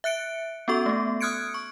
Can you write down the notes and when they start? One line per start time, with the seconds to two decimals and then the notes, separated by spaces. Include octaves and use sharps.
0.04 E5 F#6 C#7 D7
0.68 B3 C#4 F#4 A4 C#6
0.86 A3 B3
1.21 D#6 F6 F#6 G#6 C#7 D7
1.54 C#6